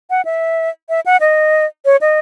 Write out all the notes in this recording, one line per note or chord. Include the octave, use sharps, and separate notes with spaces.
F#5
E5
E5
F#5
D#5
C#5
D#5